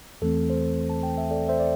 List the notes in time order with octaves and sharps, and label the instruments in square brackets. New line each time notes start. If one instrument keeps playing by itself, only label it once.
[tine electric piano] E2 E3 A3 C4 A4
C5
A5
G5
E5
A4 D5
C5 E5
D5